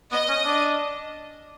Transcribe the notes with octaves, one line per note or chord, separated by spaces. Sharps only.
B3 D#5
C#4
D4